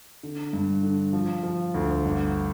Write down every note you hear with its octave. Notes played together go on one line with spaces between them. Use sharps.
D3
G2
D3
F3
F3
D2
G1